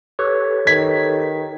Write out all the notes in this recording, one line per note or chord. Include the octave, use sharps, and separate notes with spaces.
G4 A4 B4 C#5
D#3 G#6 B6